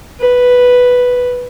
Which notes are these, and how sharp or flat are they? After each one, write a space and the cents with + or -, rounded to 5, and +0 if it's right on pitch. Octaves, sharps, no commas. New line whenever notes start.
B4 +0